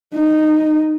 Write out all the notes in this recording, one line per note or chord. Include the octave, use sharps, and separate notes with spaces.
D#4